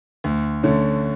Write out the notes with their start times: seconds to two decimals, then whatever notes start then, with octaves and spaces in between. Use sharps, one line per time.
0.24 D2
0.63 D3 A3 C#4